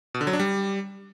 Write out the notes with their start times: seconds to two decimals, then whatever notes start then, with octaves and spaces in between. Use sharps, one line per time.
0.14 B2
0.21 D3
0.27 F#3
0.33 D4
0.40 G3